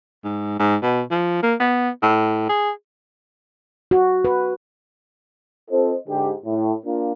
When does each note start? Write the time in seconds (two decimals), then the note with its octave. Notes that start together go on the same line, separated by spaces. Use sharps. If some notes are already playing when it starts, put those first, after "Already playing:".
0.24 G#2
0.59 G#2
0.82 B2
1.11 F3
1.43 A#3
1.60 B3
2.02 A2
2.49 G#4
3.91 F#4
4.25 B4
5.70 C4 F4 A4 C5 D#5
6.08 G#2 D3 G4
6.46 A2
6.85 A#3 D4 F4